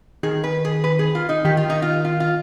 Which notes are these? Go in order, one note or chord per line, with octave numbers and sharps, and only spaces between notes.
D#3 G#4
B4
G#4
B4
G#4
F4
D#4
D#3 G4
F4
D#4
F4
F4
F4